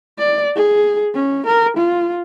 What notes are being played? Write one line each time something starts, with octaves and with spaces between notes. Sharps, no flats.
D5
G#4
C#4
A#4
F4